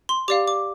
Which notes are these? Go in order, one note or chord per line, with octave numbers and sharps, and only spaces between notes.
C6
G4 D5 F5 D6
D6